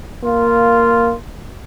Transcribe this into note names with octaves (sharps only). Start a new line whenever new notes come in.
A#3 F4